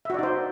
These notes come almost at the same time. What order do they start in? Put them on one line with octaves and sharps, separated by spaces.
E5 F#4 D5 D#4 C5